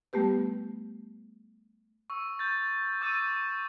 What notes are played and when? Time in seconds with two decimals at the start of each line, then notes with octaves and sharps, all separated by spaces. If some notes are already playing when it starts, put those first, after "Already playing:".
0.13 G3 A3 B3 G4 B4
2.10 C#6 E6
2.39 G6 A6
3.01 C#6 D6 E6 G6 A6 D#7